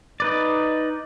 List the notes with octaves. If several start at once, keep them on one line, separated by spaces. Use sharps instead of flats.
D#4 B4 D5